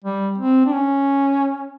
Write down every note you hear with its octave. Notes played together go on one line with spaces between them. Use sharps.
G3
C4
D4
C#4